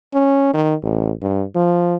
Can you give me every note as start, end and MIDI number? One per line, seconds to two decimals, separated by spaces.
0.14 0.53 61
0.54 0.74 51
0.83 1.12 33
1.22 1.44 43
1.55 1.96 53